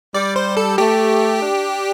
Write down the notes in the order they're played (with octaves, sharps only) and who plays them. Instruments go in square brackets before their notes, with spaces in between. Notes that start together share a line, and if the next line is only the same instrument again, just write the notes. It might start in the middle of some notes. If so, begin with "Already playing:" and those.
[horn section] G3 [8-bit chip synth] D5
[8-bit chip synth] C5
A4
[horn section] A3 [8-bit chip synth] G4
[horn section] D4